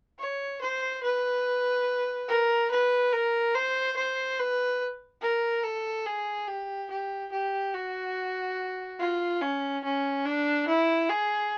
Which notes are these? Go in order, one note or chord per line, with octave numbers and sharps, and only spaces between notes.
C#5
C5
B4
A#4
B4
A#4
C5
C5
B4
A#4
A4
G#4
G4
G4
G4
F#4
F4
C#4
C#4
D4
E4
G#4